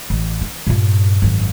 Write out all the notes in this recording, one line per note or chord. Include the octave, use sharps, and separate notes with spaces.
A1
D4
G2 A#2
G#1 F#2